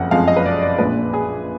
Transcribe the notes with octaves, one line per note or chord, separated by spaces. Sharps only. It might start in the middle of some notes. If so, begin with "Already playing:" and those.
Already playing: F#1 F2 F3 F#5
F#1 F2 F3 G#3 F5
D#5
B4
D5
D5
A#1 A#2 G#3 B4
G#4